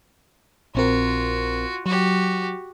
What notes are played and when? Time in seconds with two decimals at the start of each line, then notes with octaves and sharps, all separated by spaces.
0.75 A#1 C4 F4 F#4 A#4
1.86 F#3 F#4 G4